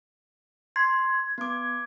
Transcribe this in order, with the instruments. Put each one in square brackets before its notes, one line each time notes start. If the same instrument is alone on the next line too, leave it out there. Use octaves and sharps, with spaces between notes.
[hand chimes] C6 [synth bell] G#6
[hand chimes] B3 D6